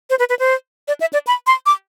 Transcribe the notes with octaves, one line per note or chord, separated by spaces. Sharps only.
C5
B4
B4
C5
D5
E5
D5
B5
C6
D6